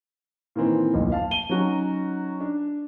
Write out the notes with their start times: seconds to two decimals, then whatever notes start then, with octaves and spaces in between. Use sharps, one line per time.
0.56 A#2 D#3 E3 C4
0.94 D1 B1 F2 A#2
1.12 F5 A5
1.31 D#7 G7
1.49 F#3 C#4 D#4 F#4
2.40 D4